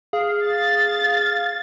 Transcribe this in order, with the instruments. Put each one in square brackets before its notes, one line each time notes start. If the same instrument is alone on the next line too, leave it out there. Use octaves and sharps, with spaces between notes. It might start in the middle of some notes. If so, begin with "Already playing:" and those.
[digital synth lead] G#4 [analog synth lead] F5
[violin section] A6